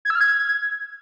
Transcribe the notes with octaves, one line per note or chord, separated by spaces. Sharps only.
G#6
E6
F6
G#6